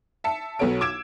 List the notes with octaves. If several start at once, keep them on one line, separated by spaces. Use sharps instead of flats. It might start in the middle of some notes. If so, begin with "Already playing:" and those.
E5 A5 C#7
B1 F#3 B3 A4 C#5 D7
D6 E6 G#6 D7 E7